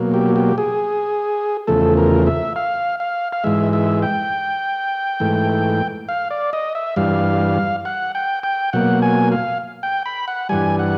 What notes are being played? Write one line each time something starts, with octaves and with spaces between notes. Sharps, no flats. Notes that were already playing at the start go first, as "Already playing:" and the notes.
Already playing: B2 F#3 A#3
G4
G4
G#4
E2 C#3 F3 A3 A4
A#4
E5
F5
F5
F5
G#2 E3 G#3 E5
E5
G5
G#2 E3 A3
F5
D5
D#5
E5
G2 E3 G3 F5
F#5
G5
G5
B2 F#3 A#3 F#5
G#5
F5
G5
B5
F#5
G2 E3 G3 G#5
F#5